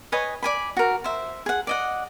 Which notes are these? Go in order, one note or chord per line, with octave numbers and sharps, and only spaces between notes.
B4 C#5 D#5 G#5
D5 G#5 B5
F#4 A#4
C5 E5
G#4 F#5
D5 D#5 F#5